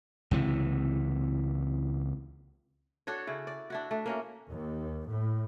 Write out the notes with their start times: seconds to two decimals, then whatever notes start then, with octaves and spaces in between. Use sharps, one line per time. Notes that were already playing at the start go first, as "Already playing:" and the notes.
0.31 C#2 C3 E3
3.07 D4 F#4 A4 C#5
3.27 C#3 E4
3.47 D5
3.70 D4 E4 F#4
3.91 A3 D4
4.06 A#3 C#4 F#4
4.50 D#2
5.08 A2